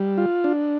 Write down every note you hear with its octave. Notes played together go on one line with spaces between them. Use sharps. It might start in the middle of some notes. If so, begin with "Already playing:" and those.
Already playing: G3
F4
D4